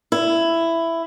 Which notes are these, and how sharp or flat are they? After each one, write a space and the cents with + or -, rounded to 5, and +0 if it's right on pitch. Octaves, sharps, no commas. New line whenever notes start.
E4 +10